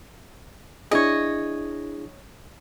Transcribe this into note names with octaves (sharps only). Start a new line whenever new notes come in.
D4 E4 G#4 C#5 D#5